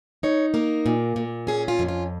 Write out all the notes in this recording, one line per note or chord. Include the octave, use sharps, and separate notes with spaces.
D#4 C#5
A#3 A#4
A#2
A#2
C#4 G#4
F4
F2
F4